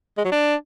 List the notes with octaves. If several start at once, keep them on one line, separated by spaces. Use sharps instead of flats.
G#3
F#3
D4